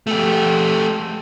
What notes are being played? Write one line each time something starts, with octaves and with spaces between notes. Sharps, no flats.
A3 G4